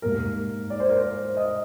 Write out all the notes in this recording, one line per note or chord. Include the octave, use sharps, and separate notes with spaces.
G#2 G3 A#3 A#4
D5
C5
A#4
C5
D#5